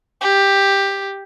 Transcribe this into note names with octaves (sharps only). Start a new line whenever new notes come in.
G4